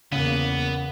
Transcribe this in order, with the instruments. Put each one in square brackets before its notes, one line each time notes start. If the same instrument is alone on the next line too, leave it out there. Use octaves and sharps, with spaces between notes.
[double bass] E2 A#3 [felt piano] C#3 [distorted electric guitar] B3